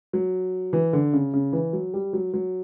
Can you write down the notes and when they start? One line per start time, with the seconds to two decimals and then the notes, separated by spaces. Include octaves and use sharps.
0.13 F#3
0.73 E3
0.93 D3
1.13 C#3
1.33 C#3
1.53 E3
1.73 F#3
1.94 G3
2.13 F#3
2.33 F#3